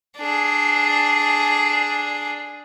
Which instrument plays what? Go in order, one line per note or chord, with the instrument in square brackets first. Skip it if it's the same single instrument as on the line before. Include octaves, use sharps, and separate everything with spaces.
[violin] D4 G#4